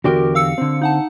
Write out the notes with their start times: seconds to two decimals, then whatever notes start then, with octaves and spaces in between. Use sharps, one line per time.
0.04 E2 D3 F#4 G4 A#4
0.35 F5 E6 C#7
0.58 D3 C4
0.81 D#4 F#5 A5